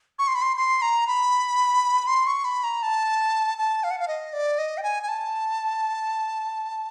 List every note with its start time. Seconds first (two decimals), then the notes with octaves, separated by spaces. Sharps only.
0.19 C#6
0.28 C6
0.35 B5
0.42 C6
0.57 C6
0.82 A#5
1.07 B5
2.07 C6
2.27 C#6
2.44 B5
2.64 A#5
2.83 A5
3.58 A5
3.84 F5
3.91 F#5
3.99 F5
4.08 D#5
4.33 D5
4.58 D#5
4.78 G5
4.83 G#5
5.03 G#5
5.08 A5